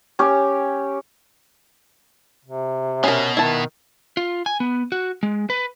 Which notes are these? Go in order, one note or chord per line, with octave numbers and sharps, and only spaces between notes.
C#4 G4 C#5
C3
B2 C#4 A#4
D#3 E4 A5
F4
G#5
B3
F#4
G#3
B4